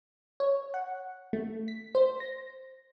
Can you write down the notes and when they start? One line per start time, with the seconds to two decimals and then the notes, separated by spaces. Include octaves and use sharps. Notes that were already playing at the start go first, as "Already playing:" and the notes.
0.40 C#5
0.74 F#5
1.33 A3
1.68 B6
1.95 C5
2.20 A#6